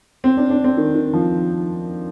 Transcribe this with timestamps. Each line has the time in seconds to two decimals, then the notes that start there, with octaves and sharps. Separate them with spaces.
0.24 C4
0.37 D4
0.50 D4
0.64 C4
0.77 D#3
0.95 D#3
1.13 F3